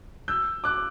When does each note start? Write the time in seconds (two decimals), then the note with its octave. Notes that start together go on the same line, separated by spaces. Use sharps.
0.28 E6 G6
0.64 D6 F#6